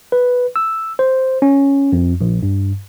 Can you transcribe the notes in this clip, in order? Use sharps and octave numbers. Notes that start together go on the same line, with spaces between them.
B4
E6
C5
C#4
F2
A#1
G2